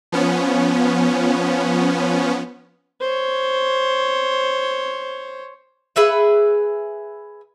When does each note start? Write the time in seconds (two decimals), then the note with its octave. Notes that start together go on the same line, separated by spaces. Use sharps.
0.12 F3 B3 C#4
3.01 C5 C#5
5.96 G#4 B4 E5 F#5